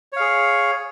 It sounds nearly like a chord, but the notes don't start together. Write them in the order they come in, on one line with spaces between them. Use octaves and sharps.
C#5 F5 G#4